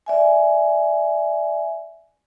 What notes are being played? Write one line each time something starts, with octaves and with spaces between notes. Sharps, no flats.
D5 E5 G#5